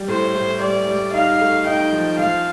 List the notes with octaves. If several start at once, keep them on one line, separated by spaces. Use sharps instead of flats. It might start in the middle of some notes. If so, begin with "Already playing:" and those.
Already playing: G3
A2 C5
A2
G3 D5
G3
D#4 F5
A3
D#4 G5
F3
F3 F5